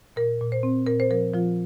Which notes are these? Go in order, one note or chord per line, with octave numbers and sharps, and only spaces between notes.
A#2 A#4
A#2
C5
C4
A#2 A#4
C5
F3 A#4
F3 F4